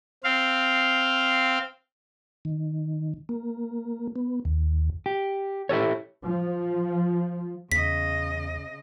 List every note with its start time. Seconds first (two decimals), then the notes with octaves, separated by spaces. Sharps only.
0.24 C4 F5
2.45 D#3
3.29 A#3
4.16 B3
4.45 D#2
5.06 G4
5.69 E4 G4 A4 C#5
6.23 F3
7.72 E2 C#3 D#5 B6